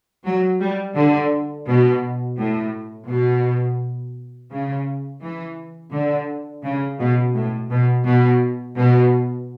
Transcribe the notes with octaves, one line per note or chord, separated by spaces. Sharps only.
F#3
G3
D3
B2
A2
B2
C#3
E3
D3
C#3
B2
A2
B2
B2
B2